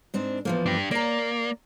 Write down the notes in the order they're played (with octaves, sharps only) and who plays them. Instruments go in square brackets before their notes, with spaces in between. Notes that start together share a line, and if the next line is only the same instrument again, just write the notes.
[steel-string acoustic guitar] G#2 C4 D4
E2 F3 A#3
[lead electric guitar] D4 G4
[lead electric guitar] A#3 [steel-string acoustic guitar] D5 A#5